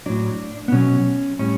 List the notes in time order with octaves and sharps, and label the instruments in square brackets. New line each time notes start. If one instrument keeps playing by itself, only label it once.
[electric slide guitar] A2 F#3 D4
B3
B2 F#3 C#4
A2 G3 C#4